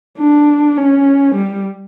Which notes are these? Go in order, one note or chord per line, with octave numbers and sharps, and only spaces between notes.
D4
C#4
G3